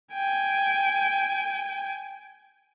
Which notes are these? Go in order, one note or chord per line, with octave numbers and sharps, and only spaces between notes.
G5 G#5